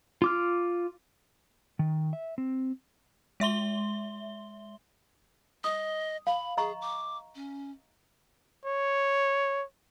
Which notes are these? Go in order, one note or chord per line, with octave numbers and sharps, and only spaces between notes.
F4 D6 F6
D#3
E5
C4
G#3 E5 C6 G7
D#5 D#6
F5 B5
G#4 D#5 A#5 C#6
D6
C#4
C#5